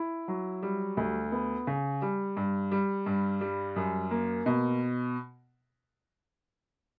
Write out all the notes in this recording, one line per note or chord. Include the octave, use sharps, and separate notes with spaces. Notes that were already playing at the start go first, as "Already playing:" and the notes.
Already playing: E4
F#3
G3
D2
B3
C#3
G3
G2
G3
G2
G3
F#2
A#3
B2